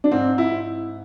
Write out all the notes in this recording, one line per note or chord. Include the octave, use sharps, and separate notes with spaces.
D4
G#2 C4
E4
G#2